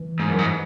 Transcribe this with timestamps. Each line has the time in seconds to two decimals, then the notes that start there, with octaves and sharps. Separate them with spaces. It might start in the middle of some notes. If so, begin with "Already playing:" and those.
Already playing: E3
0.19 G#2
0.29 F#2
0.39 G#2